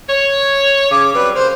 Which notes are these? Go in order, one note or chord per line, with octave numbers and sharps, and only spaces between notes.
C#5
C#3 D6
F#3 G3 C4 B4
C#3 A#3 C5